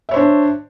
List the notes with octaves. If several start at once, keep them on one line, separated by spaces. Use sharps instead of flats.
D4 C5 C#5 E5